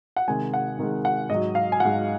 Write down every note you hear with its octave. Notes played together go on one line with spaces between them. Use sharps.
F#5
C3 D#3 G#3 G#5
F#5
C3 D#3 G#3
F#5
G#2 F#3 D#5
F5
G#5
G#2 F#3 F#5